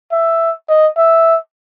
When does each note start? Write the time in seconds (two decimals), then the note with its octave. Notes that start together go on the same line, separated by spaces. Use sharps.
0.12 E5
0.69 D#5
0.98 E5